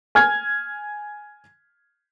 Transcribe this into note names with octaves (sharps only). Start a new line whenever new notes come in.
G#5 F6 G#6